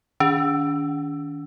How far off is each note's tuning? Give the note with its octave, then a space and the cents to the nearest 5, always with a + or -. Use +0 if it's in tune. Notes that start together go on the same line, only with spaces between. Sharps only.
D#3 +0 D4 -45